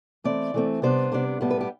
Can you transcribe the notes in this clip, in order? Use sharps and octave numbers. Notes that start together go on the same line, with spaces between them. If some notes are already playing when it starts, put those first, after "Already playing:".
E3 A3 C4 D5
E3 A3 C4
C3 G3 B3 D4 C5
C3 G3 B3 D4
A2 G3 B3
B4
G4